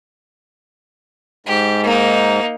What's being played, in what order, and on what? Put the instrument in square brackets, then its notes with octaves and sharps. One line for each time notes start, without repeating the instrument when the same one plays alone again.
[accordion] G#2 [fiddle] G4
[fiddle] A#3 D#4